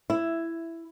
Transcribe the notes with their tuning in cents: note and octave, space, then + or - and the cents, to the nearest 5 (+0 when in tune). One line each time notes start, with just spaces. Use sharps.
E4 +10